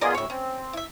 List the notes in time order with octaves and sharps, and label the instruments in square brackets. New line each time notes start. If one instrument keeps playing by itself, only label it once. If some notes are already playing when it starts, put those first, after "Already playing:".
[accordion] B3 F4 G#4 [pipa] A#4 D5 D#5
[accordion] D2 A2 [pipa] C#5 E5
[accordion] C4 [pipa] C#4
[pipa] E4 E5